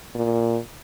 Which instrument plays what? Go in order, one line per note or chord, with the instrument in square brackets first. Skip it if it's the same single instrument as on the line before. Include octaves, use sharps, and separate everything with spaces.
[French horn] A#2